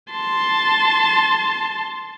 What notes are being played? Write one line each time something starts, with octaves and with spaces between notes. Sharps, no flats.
A5 C6